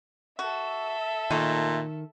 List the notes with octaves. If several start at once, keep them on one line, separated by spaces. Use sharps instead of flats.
F#4 A4 E5
A#2 D#3 A3 D#4